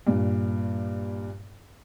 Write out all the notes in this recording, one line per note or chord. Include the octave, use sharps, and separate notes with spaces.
G2 A#2